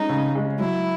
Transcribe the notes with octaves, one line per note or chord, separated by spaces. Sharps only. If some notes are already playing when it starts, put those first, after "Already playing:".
Already playing: G#3 C#4 D#4
C#3
G#3 C#4
F#3 E4